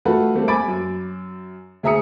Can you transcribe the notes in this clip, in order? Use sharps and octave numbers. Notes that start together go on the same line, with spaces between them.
A3 F4 F#4 A4 B4
G3 A3 A#3 C4
G#5 B5 D6 A6 D7
F#2
D2 G#4 E5 A#5 D#6 C#7